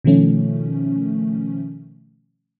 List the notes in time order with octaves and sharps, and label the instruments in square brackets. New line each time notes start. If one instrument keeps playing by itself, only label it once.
[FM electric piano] B2 D#3 F3 A3 C#4